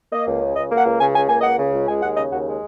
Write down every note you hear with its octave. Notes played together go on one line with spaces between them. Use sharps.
A#3 D#5
C#2
C#3
C#2 D#5
A#3
F#5
C#2
C#3 G#5
C#2 G#5
A#3 G#5
D#5
C#2 F#5
C#3
C#2
G#3 G#5
D#2 F#5
C#3 D#5
D#2 F#4
G#3